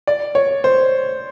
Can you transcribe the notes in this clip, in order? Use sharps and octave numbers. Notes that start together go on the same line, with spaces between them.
D5
C#5
C5